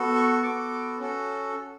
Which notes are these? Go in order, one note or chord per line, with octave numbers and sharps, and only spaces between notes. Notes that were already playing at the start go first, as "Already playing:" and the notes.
Already playing: B3 F#4 A4
C#6
C#6
B3 F#4 A4 D6
C#4 F#4 A4